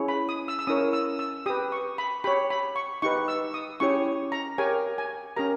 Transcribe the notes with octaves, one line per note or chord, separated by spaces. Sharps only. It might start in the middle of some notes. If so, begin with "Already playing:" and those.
Already playing: C#4 E4 G#4 C#5
B5
D#6
E6
E6
C#4 E4 A#4 C#5 D#6
E6
E6
G4 B4 D#6
C#6
B5
G4 C#5 B5
B5
C#6
D#4 G4 B4 C#6
E6
D#6
C#4 E4 G4 C#5 C#6
A#5
G4 A#4 C#5 G#5
G#5
C#4 G4 A#4 A#5